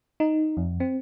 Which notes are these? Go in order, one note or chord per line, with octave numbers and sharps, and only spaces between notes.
D#4
F2
C4